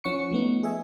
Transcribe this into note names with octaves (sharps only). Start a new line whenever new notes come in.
F3 C#4 F#5 C#6 C#7
F3 A3 B3 D#4
G#4 D#5 E5 G#5